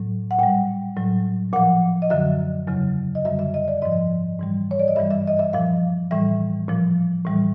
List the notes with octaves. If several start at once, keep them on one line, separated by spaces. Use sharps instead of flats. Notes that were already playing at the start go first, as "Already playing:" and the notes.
Already playing: A2 F#3
F#5
A#2 G3 G5
A2 F#3
A#2 F3 F#5
D#5
F#2 D3 F#3 E5
E2 C#3 F#3
D#5
F#2 D3 G3 E5
E5
D#5
D5
G#2 F3 D#5
G#2 E3 G3
C#5
D5
D#5
G2 E3 G3 E5
E5
D#5
E5
A#2 F3 F5
A2 E3 G3 E5
A#2 F3
A2 E3 G3